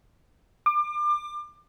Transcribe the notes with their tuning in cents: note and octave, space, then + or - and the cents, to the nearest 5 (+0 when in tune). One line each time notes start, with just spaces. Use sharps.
D6 +30